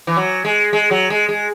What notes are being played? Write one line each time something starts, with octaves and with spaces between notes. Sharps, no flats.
E3
F#3
G#3
G#3
F#3
G#3
G#3